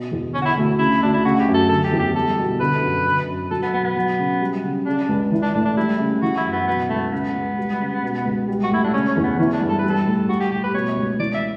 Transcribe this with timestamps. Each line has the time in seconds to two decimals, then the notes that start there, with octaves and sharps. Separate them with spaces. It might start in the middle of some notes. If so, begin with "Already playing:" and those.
Already playing: B2
0.11 E2
0.34 D3 C#4
0.41 F#4
0.45 E4
0.57 D2
0.79 C#3 E4
1.02 D2 D4
1.14 E4
1.25 C#3 F#4
1.40 G4
1.48 F#2
1.54 A4
1.69 D3 A4
1.84 G4
1.92 E2
1.99 G4
2.15 G3 A4
2.38 B2
2.60 D3 B4
2.82 F#2
3.06 D3
3.27 F#2
3.51 F#3 A4
3.62 B3
3.73 B2 B3
3.84 B3
3.96 F#3
4.19 C#3
4.41 G3
4.64 C#3
4.86 C#3 D4
5.08 C#2
5.31 E3
5.42 D4
5.55 A2 D4
5.65 D4
5.77 G3 E4
5.99 C#3
6.22 E3 F#4
6.37 E4
6.44 F#2
6.52 B3
6.68 B2 B3
6.89 C#2 A3
7.12 C#3 B3
7.35 C#2
7.58 G3
7.80 C#3
8.02 B2
8.25 C#2
8.48 G3
8.64 F#4
8.71 A2 E4
8.84 D4
8.93 C#3 C#4
9.08 C#4
9.16 E2
9.24 B3
9.39 E3 C#4
9.53 D4
9.61 G2
9.69 A4
9.79 G3 B4
9.90 A4
10.06 A2
10.29 G3 F#4
10.40 G4
10.51 A2 G4
10.63 B4
10.74 B2 C#5
10.97 C#2
11.19 E3 D5
11.34 E5